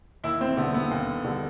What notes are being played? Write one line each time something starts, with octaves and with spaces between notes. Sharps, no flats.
D#2 E4
C4
D3 G3 B3
B3
D#2
D3 G3